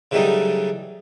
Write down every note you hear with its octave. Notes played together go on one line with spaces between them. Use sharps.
C#3 E3 F#3 G3 A3 D#4